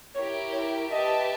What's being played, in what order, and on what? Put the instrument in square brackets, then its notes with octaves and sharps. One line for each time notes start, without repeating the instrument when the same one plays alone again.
[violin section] E4 G4 A#4 [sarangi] C#5
[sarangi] C#5
[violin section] G4 B4 E5 A5 [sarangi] D#5